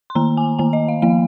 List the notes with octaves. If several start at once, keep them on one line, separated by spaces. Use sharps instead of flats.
C6
D#3 A#3 A#5
G#5
D#3 A#3 G#5
D#5
F5
F3 A#3 F5